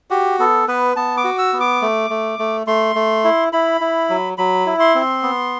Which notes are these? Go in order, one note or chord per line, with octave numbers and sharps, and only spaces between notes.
F#4 G4
B3 A4
B3 B4
B3 A5
D6
F#4
E6
B3
D6
A3
A3
A3
A3 C6
A3
E4
E4 B5
E4
F#3
F#3 B5
E4
C6
C4
B3